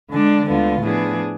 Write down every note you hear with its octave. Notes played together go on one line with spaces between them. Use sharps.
D3 G#3 D4
D2 D3 G#3 B3 F4
A2 F3 B3 D4 G#4